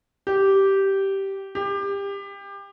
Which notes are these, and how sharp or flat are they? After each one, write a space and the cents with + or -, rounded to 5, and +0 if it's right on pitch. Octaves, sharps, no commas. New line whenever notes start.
G4 -10
G4 +25